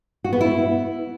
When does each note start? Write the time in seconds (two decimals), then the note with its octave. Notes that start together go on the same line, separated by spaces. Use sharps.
0.24 F#4
0.33 B3
0.41 E4